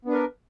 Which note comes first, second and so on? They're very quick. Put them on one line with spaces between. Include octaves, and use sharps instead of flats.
B3 D4 B4 A#4